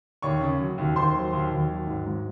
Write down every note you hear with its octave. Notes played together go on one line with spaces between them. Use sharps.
D#2 C#5 C#6
C#3
F#3
D#2
D#2 C5 C6
F#3
D#2
D#2
F#3
G#2
G#2